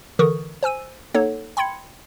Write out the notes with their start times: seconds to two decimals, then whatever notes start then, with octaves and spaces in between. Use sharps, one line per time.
0.19 D3 E3 A#4 C#6 D#6
0.63 C5 G#5 E6 D#7
1.14 A#3 D#4 A4 C#5 F#5
1.57 G5 B5 C6 G#6 C#7